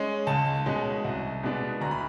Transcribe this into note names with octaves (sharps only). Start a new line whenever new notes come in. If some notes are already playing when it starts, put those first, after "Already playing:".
Already playing: G#3 C#4
C#2 A5
B2 G#3 C#4
C2
B2 G#3 B3 D4
D2 A#5
B5